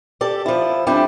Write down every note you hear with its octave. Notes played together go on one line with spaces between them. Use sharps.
G4 A4 D5
F3 E4
F2 G3 D4 E4 G4